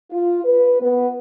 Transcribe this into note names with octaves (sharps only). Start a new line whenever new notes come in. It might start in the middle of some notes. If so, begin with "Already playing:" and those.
F4
B4
B3